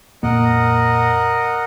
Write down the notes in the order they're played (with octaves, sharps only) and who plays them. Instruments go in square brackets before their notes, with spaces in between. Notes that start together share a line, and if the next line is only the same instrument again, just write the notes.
[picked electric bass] F2 A#2 A#3 [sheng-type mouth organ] A#4 D#5 F#5